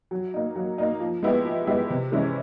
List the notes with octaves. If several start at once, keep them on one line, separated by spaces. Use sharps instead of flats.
F#3
A#3 D#4
F#3
A#3 D#4
F3
G#3 B3 E4 G4
F3
G#3 B3 E4 G4
C3
E3 G#3 C#4 E4